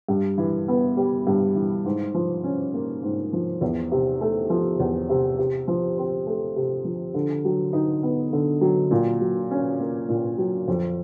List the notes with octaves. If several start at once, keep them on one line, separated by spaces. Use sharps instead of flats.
G2
E3
B3
G3
G2
E3
G#2
F3
C#4
A#3
G#2
F3
E2
C3
A3
F3
E2
C3
C3
F3
C4
A3
C3
F3
D3
F#3
D#4
B3
D3
F#3
A#2
F#3
C#4
A#3
A#2
F#3
F2